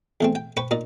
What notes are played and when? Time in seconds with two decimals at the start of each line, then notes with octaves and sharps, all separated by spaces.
0.21 E2 A3 C4
0.35 G5
0.57 B4 C5 G5 B5 C#6
0.71 A#2 D#4 D5